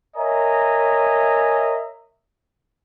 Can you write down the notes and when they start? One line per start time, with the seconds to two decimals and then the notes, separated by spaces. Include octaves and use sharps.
0.17 A#4 C#5 D#5 E5 G#5 A#5